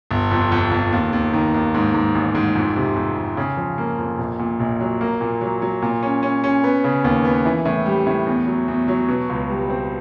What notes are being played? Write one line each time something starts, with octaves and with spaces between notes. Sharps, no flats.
G1
F2
F2
F2
D#2
D#2
D#3
D#2
G#2
G#2
A1
G#2
F2
C3
F2
F2
C#3
F3
A#3
F2
A#1
A#2
A#1
F#3
A#3
A#2
F#3
F#3
A#2
C#4
C#4
C#4
B3
C#3
D#2
B3
E3
A2
G3
A2
E2
F#3
E2
F#3
B2
C#2
G3
C4